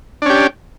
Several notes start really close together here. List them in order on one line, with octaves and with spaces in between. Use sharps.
D4 C#4 G4